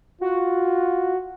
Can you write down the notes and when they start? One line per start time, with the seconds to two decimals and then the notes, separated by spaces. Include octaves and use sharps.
0.21 F4 F#4